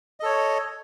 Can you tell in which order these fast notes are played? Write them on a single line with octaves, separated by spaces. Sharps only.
D#5 A4 C#5